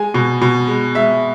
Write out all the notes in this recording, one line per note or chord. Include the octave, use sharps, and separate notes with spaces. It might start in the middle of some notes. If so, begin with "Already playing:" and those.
Already playing: G#3 G#5
B2
B2
G#3
G#3 E5